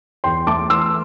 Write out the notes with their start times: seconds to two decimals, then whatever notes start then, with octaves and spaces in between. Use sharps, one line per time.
0.24 E2 G5 C6
0.47 A3 A5 D6
0.70 E3 C6 E6